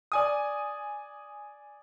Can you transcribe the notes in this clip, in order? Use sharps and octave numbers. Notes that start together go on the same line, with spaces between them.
D5 G#5 D#6